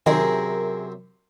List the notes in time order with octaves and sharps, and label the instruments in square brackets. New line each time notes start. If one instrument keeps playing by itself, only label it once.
[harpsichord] F#2 C3 [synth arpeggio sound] D#3 [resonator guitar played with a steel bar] G#4 A#4